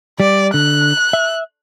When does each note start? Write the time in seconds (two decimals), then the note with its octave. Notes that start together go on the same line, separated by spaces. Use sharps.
0.20 G3 D5
0.54 D3 F#6
1.13 E5